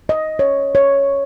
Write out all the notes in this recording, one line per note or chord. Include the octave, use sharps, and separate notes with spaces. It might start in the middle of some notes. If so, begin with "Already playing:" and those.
D#5
C#5
C#5